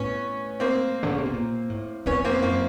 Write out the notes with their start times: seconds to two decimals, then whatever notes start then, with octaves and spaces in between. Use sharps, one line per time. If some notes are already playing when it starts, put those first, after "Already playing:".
Already playing: A2 B3 C#4
0.60 A#3 C4
1.03 D3
1.11 C#3
1.18 C3
1.25 B2
1.34 A#2
1.70 A2
2.06 F2 B3 C#4
2.24 A#3 C4
2.42 F#2 A#3 C4